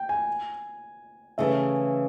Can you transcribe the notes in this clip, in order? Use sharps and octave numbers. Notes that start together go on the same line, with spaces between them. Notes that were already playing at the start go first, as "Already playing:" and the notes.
Already playing: G5
G#5
C#3 E3 A3 E5